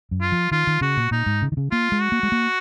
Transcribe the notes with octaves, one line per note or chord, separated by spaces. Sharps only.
F#2
F4
F3
D#3 F4
D#3
C#3 F#4
A#2
A#2 D#4
G#2
C#3
D#3
C#3
A#3 F4
G#3
F#4
A#3
G#3
A#3